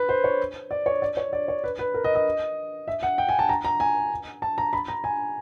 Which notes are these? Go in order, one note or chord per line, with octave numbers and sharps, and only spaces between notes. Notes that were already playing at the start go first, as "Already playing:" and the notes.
Already playing: B4
C5
C#5
D5
C#5
D5
C#5
D5
C#5
B4
B4
A#4
D#5
D#5
E5
F#5
G5
G#5
A5
A#5
A#5
G#5
A5
A#5
B5
A#5
G#5